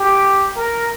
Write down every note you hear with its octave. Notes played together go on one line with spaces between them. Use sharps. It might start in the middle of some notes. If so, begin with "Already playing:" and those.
Already playing: G4
A#4